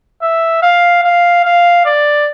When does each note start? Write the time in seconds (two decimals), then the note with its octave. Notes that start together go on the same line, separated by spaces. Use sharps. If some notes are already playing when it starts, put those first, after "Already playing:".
0.22 E5
0.63 F5
1.04 F5
1.45 F5
1.85 D5